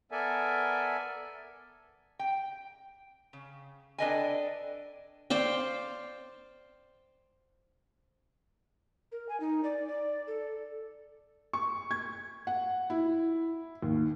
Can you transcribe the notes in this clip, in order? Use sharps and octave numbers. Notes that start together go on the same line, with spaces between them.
B3 A4 A#4 D5 E5 G#5
G5
C#3
D4 A4 B4 D#5 G5 G#5
C5 D5 F5 G5
A#4
G#5
D#4
D5
D5
A4
C#6
G#6
F#5
E4
D#2